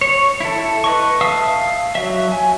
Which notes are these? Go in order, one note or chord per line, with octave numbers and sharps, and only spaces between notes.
C#5
E4 A4
B4 D#5 C#6
E5 F5 A5 D#6 E6
F#3 E5
G#5